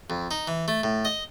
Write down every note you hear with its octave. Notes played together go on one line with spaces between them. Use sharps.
F2
D#4
E3
A3
A2
D#5